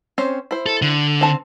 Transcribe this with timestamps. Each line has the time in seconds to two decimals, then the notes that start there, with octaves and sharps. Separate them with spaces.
0.18 C4 C#4 C5
0.51 E4 C5
0.66 A4
0.82 D3
1.21 C4 A5